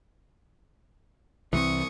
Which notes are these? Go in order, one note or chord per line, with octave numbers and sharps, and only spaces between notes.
C2 E3 G3 C4 C#6 D#6